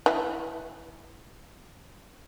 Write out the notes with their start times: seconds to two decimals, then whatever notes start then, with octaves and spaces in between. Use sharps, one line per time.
0.06 E3 E4